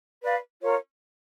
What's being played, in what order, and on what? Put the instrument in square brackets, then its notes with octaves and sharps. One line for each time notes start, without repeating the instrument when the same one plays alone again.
[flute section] B4 D5 F5
F4 A#4 C#5